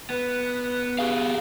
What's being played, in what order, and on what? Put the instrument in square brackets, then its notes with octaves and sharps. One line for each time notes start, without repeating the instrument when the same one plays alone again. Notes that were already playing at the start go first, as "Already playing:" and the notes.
[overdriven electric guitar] B3 [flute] B4
[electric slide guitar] G4 G#4 F5